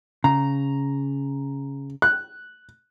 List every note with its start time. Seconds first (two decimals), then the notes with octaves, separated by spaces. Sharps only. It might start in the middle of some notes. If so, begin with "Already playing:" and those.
0.24 C#3 A#5
2.02 F#6